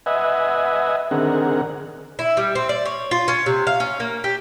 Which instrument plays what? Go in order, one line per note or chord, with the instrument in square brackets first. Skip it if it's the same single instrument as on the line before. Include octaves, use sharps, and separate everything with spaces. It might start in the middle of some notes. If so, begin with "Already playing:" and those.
[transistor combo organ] B4 D#5 E5 F#5 G#5
D3 D#3 C4 G#4 A#4 F#5
[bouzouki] E4
G3
C4
D5
C#5
F4
C#4
C3
F5
C#4
A#3
G4